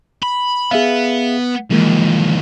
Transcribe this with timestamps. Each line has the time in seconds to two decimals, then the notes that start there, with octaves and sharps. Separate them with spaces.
0.23 B5
0.71 B3 G#4 E5 F5
1.70 D#2 E3 F3 G#3 A#3